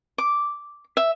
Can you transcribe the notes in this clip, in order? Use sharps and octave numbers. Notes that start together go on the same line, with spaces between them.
D6
E5